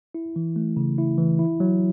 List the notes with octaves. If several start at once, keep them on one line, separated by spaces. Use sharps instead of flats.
E4
E3
A3
C#3
E4
E3
E4
F#3